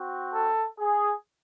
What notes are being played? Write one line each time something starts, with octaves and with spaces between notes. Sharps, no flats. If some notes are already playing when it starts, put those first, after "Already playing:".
Already playing: C4 F#4
A4
G#4